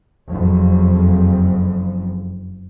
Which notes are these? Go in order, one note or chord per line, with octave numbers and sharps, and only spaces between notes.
F#1 F2